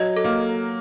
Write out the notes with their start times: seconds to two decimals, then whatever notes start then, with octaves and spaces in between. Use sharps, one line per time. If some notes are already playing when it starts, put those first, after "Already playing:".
Already playing: F#3 D#5
0.17 A4
0.24 A#3